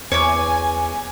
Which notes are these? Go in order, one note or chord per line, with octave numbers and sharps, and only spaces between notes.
E2 C#5 G#5 D6